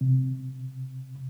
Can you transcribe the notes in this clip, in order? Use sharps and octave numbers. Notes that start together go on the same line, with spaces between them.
C3